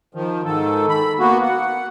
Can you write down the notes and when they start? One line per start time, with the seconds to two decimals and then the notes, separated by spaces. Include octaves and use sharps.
0.15 D#3 F3
0.45 G#2 D#3 A4
0.89 B5
1.19 A#3 B3 F#4
1.43 F#5